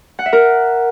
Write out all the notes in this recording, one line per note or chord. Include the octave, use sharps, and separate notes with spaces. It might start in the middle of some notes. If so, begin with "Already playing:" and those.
F#5
E5
A#4